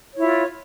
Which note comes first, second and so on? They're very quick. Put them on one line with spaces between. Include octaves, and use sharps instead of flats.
C#5 E4 F4